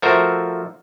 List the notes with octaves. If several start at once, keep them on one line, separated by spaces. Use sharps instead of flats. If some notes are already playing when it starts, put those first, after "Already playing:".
F3 A3 F#4 A#4 C5 E5